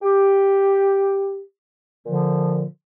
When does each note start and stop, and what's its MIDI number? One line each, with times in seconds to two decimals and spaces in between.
0.02 1.42 67
2.06 2.63 46
2.06 2.63 50
2.06 2.63 53